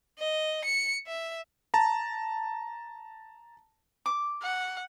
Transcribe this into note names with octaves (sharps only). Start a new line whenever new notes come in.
D#5
C#7
E5
A5 A#5
D6
F#5